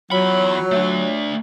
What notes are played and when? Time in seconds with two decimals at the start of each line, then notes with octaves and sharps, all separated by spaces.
0.11 E2 F#3 F4 C#5 B5
0.72 A3 D4